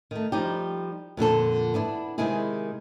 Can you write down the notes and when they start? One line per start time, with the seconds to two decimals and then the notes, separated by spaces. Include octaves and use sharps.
0.11 D#3 A3
0.32 F3 G3 D#4 G4
1.17 F2 A#2 D3 A4
1.74 B3 D4 E4
2.18 C3 D#3 G#3 E4 G#4